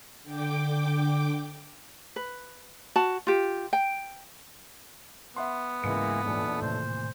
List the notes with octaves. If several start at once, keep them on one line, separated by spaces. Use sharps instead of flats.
D3 G5 D6
B4
F#4 A5
F4 G4
G5
B3 E5 F#5 C6
C#2 G#2 E3 G#3 A#3 C#7
B1 E2 A#2 A3 D4
A2 C3 D#3 C5